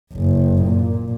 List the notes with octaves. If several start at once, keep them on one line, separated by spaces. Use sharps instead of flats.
F#1
A#2